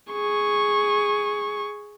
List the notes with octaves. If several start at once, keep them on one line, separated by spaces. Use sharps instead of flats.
G#4 C#6